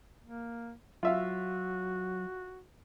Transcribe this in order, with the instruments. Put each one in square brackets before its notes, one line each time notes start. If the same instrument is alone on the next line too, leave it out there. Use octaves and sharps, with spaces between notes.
[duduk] A#3
[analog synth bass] F#3 [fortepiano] F4 E5 F5 [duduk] F#4